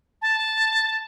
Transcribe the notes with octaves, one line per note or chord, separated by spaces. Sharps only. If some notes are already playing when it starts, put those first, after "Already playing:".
A5